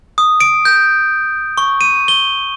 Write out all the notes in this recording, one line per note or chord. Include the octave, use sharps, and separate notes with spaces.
D#6
D7
G6
C#6
D#7
G7